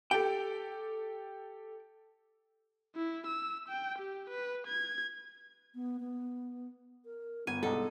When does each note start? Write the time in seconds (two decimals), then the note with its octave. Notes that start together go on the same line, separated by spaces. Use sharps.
0.11 G4 A4 G5
2.96 E4
3.27 E6
3.69 G5
3.99 G4
4.30 B4
4.67 G#6
5.75 B3
6.00 B3
7.05 A#4
7.47 G1 B3 G#5
7.63 C2 G#2 A4